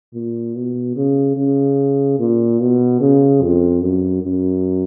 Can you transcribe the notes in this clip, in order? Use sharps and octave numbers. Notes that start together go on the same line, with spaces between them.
A#2
B2
C#3
C#3
A#2
B2
C#3
F2
F#2
F#2